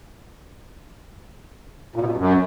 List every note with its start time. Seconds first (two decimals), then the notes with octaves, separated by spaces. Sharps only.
1.96 A#2
2.01 B2
2.07 A#2
2.12 G2
2.18 F#2